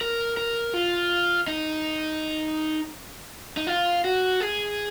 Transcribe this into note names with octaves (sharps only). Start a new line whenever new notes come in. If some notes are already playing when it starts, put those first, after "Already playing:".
A#4
A#4
F4
D#4
D#4
F4
F#4
G#4